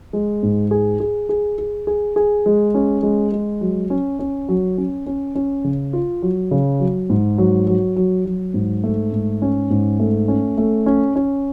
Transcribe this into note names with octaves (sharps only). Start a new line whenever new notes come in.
G#3
G#2
G#4
G#4
G#4
G#4
G#4
G#4
G#3
C#4
G#3
G#3
F#3
C#4
C#4
F#3
C#4
C#4
C#4
C#3
F4
F#3
C#3
F#3
G#2
F#3
F#3
F#3
F#3
G#2
A3
G#2
C#4
G#2
A3
C#4
A3
C#4
C#4